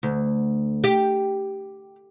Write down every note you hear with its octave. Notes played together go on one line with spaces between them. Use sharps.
D2
G4